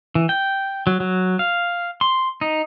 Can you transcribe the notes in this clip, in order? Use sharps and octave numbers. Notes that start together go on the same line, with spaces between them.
E3
G5
F#3
F#3
F5
C6
D#4